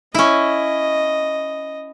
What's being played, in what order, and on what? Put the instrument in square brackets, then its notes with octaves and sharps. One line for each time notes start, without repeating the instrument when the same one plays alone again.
[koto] C#4 E4 [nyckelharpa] D#5